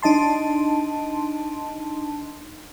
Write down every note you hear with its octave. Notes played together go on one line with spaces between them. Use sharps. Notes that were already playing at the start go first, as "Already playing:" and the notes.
D4 D#4 D#5 A5 C6